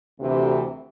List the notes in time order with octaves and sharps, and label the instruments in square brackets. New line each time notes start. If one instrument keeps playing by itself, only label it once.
[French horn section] D2 C3 E3